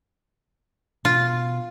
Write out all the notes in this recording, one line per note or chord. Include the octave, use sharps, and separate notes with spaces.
B2 F4